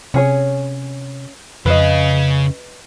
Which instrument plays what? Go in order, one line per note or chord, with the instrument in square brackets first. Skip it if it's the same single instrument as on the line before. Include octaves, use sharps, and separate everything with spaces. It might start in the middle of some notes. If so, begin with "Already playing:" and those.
[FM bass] C3 [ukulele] C#4 G#4 C#5
[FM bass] F2 [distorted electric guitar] C#3 F5 [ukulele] B4 D#5